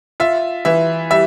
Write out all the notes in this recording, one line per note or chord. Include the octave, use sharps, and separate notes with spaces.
F4 E5
E3 E5
G3 E5